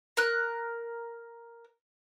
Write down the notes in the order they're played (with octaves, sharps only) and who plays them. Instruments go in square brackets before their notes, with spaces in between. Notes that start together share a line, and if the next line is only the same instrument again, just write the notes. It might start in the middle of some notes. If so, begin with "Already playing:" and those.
[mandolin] A#4 F#6